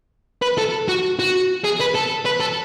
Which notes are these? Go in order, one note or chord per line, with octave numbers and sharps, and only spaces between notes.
B4
A4
F#4
F#4
G#4
B4
A4
B4
A4